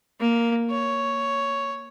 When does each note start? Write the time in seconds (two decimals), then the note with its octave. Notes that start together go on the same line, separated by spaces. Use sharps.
0.20 A#3
0.70 C#5